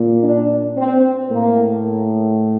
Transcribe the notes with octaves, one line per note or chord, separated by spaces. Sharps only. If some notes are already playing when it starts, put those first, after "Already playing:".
Already playing: A#2
D4
C4
A2 A#3